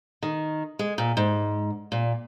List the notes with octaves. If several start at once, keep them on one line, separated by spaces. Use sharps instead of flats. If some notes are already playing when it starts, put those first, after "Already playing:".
D#3
G#3
A#2
G#2
A#2